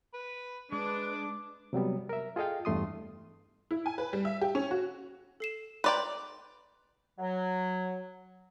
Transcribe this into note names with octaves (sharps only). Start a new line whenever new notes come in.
B4
G#3 D4 B4 D6
C3 F#3 G3 B3
A#4 E5
F4 G#4 A4 D#5 F5 G5
E2 G2 A3 C6 D#6
E4
G#5
B4
G3
E5
G4
C#4
F#4
A4 C7 E7
B4 D5 G5 A#5 C6
F#3